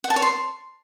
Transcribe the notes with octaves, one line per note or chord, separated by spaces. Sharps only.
F#5
A5
C#5
C6